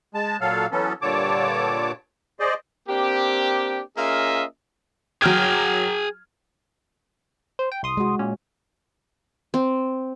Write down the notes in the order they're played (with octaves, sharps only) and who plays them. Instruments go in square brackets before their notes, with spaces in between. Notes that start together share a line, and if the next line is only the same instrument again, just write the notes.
[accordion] G#3 A5
A#2 F#3 A4 F5
E3 F#3 B3 C#4 A4
G2 A#2 D3 C#5 A5 D6
G#4 C5 D5 D#5
[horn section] A#3 C4 D4 G4
A#3 C#4 F4 G#4 D#5 E5
[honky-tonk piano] F#3 F6 G#6 [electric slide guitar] G#4 G5
[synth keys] C5
G5
C2 C6 D#6
[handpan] G#3 F#4
[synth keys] A#2 C#4
[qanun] C4